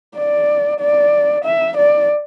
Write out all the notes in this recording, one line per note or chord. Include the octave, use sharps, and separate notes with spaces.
D5
D5
E5
D5